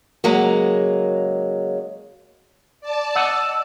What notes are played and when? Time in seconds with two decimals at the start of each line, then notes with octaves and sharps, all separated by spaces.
0.24 C#3 F#3 G#3 A#3
2.81 D5 A5
3.15 D#5 F#5 E6